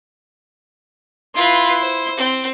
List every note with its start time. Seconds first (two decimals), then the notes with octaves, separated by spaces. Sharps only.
1.36 E4 F4 B4 C6
1.81 C5
2.17 C4